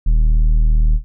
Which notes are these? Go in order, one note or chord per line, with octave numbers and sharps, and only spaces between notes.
D#1